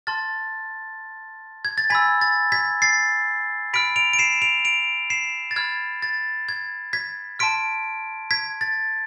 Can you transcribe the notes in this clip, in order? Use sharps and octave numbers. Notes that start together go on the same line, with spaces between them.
A5 C6 F6 A6
G#6
A6
G#5 B5 E6 G#6 B6
A6
G#6 B6
A6 C7
B5 F6 B6 D7
D7 F7
D7
C7 E7
D7 F7
D7 F7
C7 E7
A6
B5 F6 G#6
A6
G#6
G#6 B6
A5 C6 F6 B6 D7
G#6 B6
A6